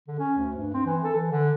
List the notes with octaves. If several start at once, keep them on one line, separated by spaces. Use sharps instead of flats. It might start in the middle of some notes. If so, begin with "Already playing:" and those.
D3
C#4
D2
G2
C4
E3
A4
E3
D3